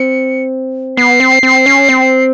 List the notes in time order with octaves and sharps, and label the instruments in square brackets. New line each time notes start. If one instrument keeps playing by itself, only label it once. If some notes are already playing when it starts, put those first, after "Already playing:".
Already playing: [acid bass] C4 [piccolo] C#7
[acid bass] B3 [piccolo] C7
[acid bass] C4
C4
C#4
C4